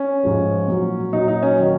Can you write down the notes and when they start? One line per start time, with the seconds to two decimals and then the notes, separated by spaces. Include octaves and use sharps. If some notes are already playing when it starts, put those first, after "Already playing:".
Already playing: C#4
0.23 G#2 F3 G#3
0.67 A#2 F#3
1.12 A#2 F#3 D#4
1.28 D#4
1.43 C#4
1.58 D#3 F#3